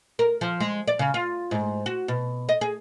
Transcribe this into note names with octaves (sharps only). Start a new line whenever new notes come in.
A#4
F3
G#3
D5
C#3
F4
G#2
F#4
B2
D#5
G#4